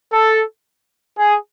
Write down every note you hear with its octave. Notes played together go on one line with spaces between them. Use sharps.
A4
G#4